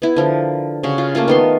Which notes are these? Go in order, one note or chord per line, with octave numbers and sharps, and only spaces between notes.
B3 E4
D3 F3 A#4
C#3 F#4
F4
A3 A#3 C#4 F4
D#3 B3 C6